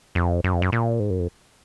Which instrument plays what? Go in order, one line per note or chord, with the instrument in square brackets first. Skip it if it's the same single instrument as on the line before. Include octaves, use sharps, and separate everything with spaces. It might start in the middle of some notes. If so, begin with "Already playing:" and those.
[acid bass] F2
F#2
F2
F#2
A#2
G#2
F#2
F2